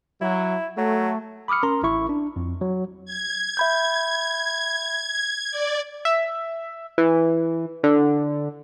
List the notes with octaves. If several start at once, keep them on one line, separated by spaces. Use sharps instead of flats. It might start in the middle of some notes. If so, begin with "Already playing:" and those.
F#3 E4
F#3 A3
B5 D6 D#6 F6 C#7
C#4 A#4 A#5 C6
A1 E4 C#6
D4
F2
F#3
G#6
E5 B5 G6
D5
E5
E3
D3